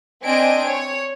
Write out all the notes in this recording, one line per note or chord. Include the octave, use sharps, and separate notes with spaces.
C4 D4 D#5 G#5 D7
C#5